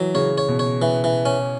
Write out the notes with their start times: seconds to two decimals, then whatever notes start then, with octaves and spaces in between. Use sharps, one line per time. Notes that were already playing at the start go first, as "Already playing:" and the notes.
Already playing: E3 F#3
0.14 C#3 C#5
0.38 C#5
0.48 B2
0.59 C#5
0.82 E3
1.04 E3
1.25 C#4